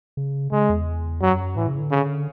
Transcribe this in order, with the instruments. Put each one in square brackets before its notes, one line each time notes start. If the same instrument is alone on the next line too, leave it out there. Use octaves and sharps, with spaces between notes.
[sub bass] C#3
[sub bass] C#3 [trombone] G#3
[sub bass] E2
[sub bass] F#2 [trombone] F#3
[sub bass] A2 [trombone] E3
[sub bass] C#3
D3
[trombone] C#3